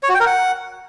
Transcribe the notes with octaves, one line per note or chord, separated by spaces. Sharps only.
C#5
F#4
G5
A#4
F#5